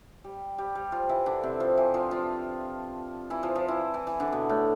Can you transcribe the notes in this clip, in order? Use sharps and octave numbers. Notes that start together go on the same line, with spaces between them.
G3
G3
G3
F3 F4
E3 E4
D3 D4
C3 C4
F3 F4
E3 E4
F3 F4
F3 F4
E3 E4
F3 F4
F3 F4
E3 E4
E3 E4
E3 E4
D3 D4
B2 B3
A2 A3